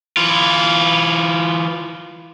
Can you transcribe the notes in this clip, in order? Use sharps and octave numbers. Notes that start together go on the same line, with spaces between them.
E3 F4